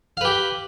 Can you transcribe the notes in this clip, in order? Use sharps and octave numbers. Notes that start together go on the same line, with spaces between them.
G4 B4 F5